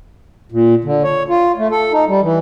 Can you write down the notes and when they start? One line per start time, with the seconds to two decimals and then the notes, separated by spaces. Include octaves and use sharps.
0.52 A#2
0.84 D3
1.04 C#5
1.29 F4
1.58 A3
1.71 A4
1.92 D#4
2.08 G3
2.22 E3